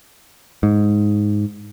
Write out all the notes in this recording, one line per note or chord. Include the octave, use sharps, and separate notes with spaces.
G#2